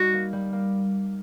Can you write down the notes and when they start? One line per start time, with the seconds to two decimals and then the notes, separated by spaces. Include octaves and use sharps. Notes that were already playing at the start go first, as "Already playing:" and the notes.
Already playing: G3 D#4 F#4
0.14 A#3
0.33 G3
0.53 A#3